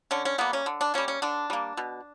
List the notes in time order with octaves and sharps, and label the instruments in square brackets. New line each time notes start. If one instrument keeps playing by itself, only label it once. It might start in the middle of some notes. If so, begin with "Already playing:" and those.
[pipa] D3 C#4
C#4
G3 A#3 B3
C#4
D3
D4
G3 A#3 C#4
C#4
D3 D4
G3 A#3
B2